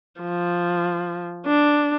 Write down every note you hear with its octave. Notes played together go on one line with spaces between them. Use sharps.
F3
D4